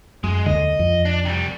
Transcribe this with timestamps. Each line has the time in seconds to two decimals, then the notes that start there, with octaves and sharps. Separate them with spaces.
0.24 F#2 G#3
0.46 D#2 D3 D#5
0.79 F2
1.05 D4
1.25 C3 G3